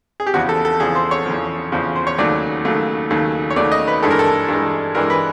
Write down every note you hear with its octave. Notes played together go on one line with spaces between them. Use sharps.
G#4
G4
E2 C#3 F3 F#4
A4
A4
E2 C#3 F3 G#4
C5
C#5
E2 C#3 F3
E2 C#3 F3
C5
C#5
D#2 C#3 F#3 A3 D5
D#2 C#3 F#3 A3
D#2 C#3 F#3 A3
C#5
D#2 C#3 F#3 A3 D5
D#5
B4
G2 E3 G#3 A4
A#4
A4
G2 E3 G#3
G2 E3 G#3 A#4
B4